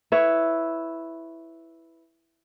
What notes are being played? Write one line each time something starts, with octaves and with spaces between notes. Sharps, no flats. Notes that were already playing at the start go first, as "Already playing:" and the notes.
E4 B4 C#5